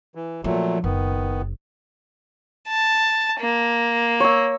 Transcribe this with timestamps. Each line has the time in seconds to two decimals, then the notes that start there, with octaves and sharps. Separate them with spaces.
0.15 E3
0.44 A#2 F3 F#3 A3
0.84 F#1 D#3 B3
2.68 A5
3.41 A#3
4.20 C#5 E6